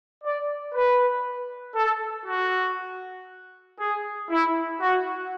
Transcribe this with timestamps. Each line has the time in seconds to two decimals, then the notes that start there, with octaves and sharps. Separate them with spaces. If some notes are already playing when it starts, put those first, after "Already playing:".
0.22 D5
0.72 B4
1.74 A4
2.25 F#4
3.77 G#4
4.28 E4
4.78 F#4